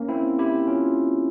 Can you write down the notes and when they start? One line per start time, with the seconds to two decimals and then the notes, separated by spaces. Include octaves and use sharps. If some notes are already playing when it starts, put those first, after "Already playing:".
Already playing: A#3 C#4
0.08 C4 E4
0.39 E4 G4
0.67 C#4 F4